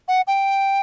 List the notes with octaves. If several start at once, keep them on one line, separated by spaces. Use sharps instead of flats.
F#5
G5